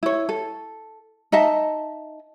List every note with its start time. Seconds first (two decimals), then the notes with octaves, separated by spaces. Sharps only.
0.03 E4 C#5
0.29 A4
1.32 D#4 D#5 E5 A5